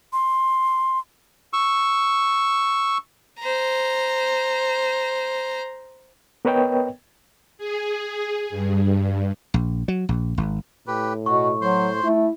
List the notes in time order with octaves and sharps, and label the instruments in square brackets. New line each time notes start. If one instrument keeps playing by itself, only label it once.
[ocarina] C6
[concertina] C#6 E6
[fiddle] C5 A#5
[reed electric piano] B3 A#4 B4 C#5 D#5 G5
[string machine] G#4
G2
[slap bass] A#1
F#3
A#1
G#1
[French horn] A2 [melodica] G4 B4
[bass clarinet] B2 [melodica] F#4 [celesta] C#6
[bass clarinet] F#3 [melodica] C5 C6
[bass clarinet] A3 [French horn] E4